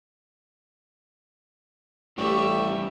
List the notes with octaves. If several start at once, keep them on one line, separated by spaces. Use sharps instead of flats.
A1 A2 G3 G4 D5 E5 C#6